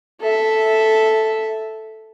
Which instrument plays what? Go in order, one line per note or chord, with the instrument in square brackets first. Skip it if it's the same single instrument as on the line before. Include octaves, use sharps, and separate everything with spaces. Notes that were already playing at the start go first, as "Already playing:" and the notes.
[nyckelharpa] A4 E5